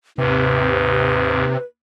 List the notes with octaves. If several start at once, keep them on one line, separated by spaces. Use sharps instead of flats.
D#2 G#2 C3 B4